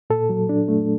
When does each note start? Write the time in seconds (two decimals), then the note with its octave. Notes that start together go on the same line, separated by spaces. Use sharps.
0.10 A#2 A4
0.30 F#3
0.49 D4
0.68 A3